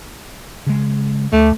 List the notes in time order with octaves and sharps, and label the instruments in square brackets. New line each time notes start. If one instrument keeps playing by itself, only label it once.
[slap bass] C#3 G#3
[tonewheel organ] D2 [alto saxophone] A3